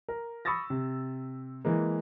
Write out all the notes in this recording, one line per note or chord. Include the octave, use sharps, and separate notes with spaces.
A#4
B5 C#6 D#6 E6 A6 A#6
C3
E3 G#3 A#3